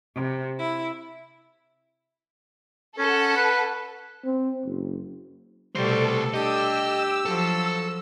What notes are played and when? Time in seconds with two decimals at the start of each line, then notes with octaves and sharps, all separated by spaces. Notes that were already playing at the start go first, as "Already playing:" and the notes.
0.15 C3
0.58 E4
2.98 C#4 A4 F#5
3.36 B4
4.24 C4
4.65 F#1
5.75 C2 B2 G3 A3 A4 C5
6.34 D4 G4 D#5 E6
7.26 F3 F#3 A4